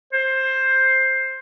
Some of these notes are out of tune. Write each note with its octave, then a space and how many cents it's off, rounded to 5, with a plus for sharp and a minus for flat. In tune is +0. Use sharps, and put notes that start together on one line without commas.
C5 +10